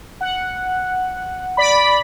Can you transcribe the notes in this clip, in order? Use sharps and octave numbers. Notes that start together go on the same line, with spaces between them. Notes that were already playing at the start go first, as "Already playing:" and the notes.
F#5
D5 B5